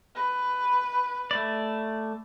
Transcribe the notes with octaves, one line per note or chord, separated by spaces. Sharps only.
B4
A3 D5